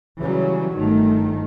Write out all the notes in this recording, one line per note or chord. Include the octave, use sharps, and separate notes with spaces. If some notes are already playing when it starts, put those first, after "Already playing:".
C#3 E3 F#3 G3 C#4
G1 D#3 A3